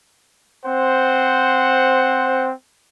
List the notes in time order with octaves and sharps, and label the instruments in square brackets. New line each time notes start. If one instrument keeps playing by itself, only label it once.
[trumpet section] C4 C5 F#5